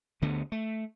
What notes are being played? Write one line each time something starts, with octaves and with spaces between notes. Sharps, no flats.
D2 D3 A3 B3
A3